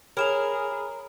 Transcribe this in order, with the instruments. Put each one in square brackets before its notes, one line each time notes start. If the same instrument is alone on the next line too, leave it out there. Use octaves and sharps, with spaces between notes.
[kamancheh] G#4 [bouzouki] A#4 [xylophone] C#5 E7 F7 [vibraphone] B5